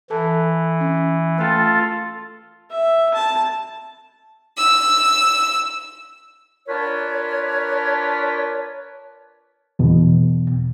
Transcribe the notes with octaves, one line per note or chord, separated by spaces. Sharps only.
E3 A4 A5
C#4
A3 F4 A4 G5
E5
A5
E6
D4 F4 A#4 B4 C#5
E2 B2